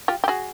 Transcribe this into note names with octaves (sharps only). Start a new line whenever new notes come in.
F4 G4
G4
F#4 G#4